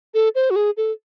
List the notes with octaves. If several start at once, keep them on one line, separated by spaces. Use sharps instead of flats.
A4
C5
F#4
G#4
A4